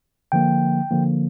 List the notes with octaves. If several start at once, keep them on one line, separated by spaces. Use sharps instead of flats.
D3 F3 A#3 G5
D3 F3 A#3